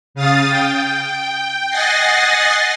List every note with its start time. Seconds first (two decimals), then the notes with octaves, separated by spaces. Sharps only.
0.14 C#3 F5 D#6 A6
0.47 G5
1.70 D#5 F#5 G#5 A6 A#6 C7